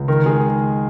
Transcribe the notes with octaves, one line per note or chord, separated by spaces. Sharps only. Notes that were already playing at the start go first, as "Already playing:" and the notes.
Already playing: C#2
D#3 A#4
G#3 G#4